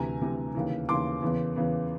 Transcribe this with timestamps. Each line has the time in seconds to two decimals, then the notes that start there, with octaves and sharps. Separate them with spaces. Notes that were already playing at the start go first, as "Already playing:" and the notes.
Already playing: D2 C3 E3 G#5 A#5
0.21 D2 C3 E3
0.55 D#2 C#3 E3
0.88 D#2 C#3 E3 C6 D6
1.22 E2 C#3 E3
1.56 E2 C#3 E3